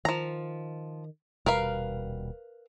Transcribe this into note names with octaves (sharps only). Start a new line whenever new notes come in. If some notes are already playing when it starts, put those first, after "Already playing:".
D#3 F3 A#5
D#1 B2 G3 A#4 B4 F5